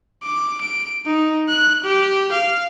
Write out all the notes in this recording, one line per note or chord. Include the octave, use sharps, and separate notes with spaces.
D6
D7
D#4
F#6
G4
F5